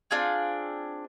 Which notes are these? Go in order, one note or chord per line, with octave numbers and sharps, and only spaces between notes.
C4 D4 F4 G#4